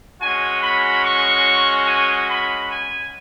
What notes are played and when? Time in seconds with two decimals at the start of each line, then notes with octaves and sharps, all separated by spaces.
0.21 G#3 C#4 F#4 G#5
0.63 B5
1.05 C#6
1.88 G#5
2.30 B5
2.71 G#5